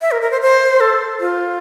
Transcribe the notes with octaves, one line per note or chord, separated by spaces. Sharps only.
E5
A#4
A#4
C5
C5
A4
F4